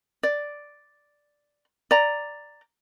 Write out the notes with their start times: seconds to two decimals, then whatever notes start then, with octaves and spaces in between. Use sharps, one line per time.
0.23 D5
1.91 D5 A#5